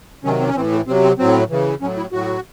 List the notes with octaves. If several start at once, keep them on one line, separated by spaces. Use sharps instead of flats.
C3 D#3 F#3 C#4
C4
C#4
A2 E3 C4
A3
C3 F#3 C4
C4
A2 F#3 C4
C#3 E3
A2 F#3 C#4
E4
A2 F#3 F#4